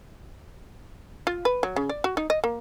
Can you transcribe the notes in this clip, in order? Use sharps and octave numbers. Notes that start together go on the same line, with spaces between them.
F4
B4
F#3
C#3
D5
F#4
D#4
D#5
A#3